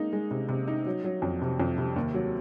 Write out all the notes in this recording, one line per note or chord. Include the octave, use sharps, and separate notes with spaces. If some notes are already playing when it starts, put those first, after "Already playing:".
Already playing: G#3 A#3 D#4
G#3
C3
C3
D#4
F#3
F#3
F2
C3
F2
C3
D#2
F#3